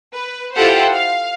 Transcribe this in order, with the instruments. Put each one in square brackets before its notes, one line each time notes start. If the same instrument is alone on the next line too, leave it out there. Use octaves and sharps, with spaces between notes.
[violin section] B4
E4 F4 G4 A4 C5 F#5
F5